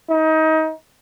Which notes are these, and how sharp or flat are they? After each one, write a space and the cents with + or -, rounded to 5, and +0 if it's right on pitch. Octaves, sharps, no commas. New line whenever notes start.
D#4 +25